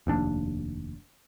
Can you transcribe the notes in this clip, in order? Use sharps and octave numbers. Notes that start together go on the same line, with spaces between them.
F1 D#2 D4